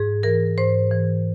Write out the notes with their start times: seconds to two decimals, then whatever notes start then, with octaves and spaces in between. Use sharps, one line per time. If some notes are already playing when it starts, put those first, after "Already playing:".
Already playing: G#2 G#4
0.23 E3 A#4
0.58 G#2 C5
0.91 E3